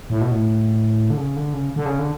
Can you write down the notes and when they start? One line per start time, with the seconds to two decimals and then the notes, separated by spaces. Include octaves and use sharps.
0.10 A2
0.21 B2
0.31 A2
1.10 D3
1.17 C#3
1.36 D3
1.53 C#3
1.76 D3
1.86 C#3
1.99 D3